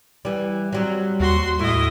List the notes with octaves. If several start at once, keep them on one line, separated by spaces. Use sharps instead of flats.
E3 G3
F#3 G3 C4
D#2 F#4 C6
A2 E4 D#5